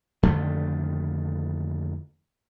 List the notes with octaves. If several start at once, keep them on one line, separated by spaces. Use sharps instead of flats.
F2 D3 D#3 A3